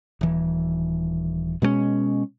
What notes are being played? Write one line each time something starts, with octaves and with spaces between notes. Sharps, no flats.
D#1 E3
B2 G#3 A#3 C#4